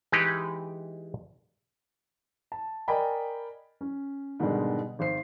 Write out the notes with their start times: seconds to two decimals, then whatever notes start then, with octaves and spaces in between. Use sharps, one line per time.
0.12 E3 G#3 D#4 G4 B4
2.52 A5
2.88 A#4 D5 D#5 G5 G#5 B5
3.81 C#4
4.40 G#2 B2 D3 D#3 G3 G#3
4.99 G#1 C5 C7